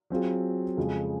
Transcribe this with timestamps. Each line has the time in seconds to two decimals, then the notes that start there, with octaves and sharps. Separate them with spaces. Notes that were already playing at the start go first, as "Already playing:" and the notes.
0.10 F#3 C4 F4 G#4
0.77 F2 C#3 G#3